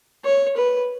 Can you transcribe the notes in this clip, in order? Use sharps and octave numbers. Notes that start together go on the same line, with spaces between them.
C#5
B4